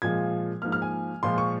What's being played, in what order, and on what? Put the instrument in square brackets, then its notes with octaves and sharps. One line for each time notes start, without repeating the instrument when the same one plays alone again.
[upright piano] A#2 F3 G#3 G#6
G#2 F3 A#3 F6
F6
G#5
A#2 F3 G#3 C6
C#6